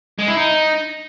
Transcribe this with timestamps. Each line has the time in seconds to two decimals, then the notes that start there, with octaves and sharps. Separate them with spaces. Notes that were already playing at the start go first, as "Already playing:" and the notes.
0.19 G#3
0.28 E4
0.37 D#4